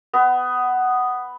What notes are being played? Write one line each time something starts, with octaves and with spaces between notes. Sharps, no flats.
B3